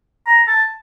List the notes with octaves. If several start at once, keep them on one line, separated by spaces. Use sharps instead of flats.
A#5
A5